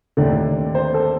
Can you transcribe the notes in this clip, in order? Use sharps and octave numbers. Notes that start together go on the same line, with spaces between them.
D#2 D3 A3 D5
C5
A4